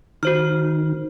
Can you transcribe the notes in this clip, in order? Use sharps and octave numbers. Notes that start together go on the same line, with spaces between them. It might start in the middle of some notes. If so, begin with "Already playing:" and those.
D#3 D#4 F#4 C5 F6